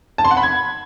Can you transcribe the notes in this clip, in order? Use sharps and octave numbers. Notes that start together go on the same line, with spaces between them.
A5
C6
F#5
B5
G#6